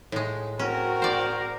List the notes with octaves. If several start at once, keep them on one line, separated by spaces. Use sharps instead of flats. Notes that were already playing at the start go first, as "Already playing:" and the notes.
A2 G#3
C4 C#4 F#4 A#4
C5 D5